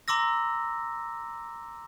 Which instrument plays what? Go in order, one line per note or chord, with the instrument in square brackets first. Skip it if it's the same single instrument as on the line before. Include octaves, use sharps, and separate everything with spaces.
[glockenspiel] A#5 C6 D6 E6 A#6